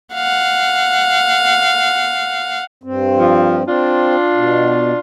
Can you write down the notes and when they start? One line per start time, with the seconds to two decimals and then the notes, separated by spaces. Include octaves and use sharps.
0.14 F5 F#5
2.84 G2 C4
3.18 F3
3.67 C4 D4 F4
4.34 B2